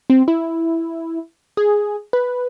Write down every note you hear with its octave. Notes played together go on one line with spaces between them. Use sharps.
C4
E4
G#4
B4